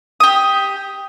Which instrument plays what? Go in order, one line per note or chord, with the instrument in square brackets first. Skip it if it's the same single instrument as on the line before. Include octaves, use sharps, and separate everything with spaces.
[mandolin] G4 D#6